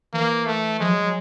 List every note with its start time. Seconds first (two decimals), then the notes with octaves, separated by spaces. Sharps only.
0.13 E3 A#3
0.46 A3
0.80 F3 G#3
0.88 F#3
1.04 F#3